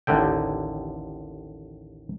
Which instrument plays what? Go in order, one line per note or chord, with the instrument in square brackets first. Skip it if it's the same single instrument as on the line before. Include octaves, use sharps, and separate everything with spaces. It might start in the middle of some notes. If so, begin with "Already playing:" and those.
[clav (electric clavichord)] A1 D#2 D3 G5